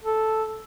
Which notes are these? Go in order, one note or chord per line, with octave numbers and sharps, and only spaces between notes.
A4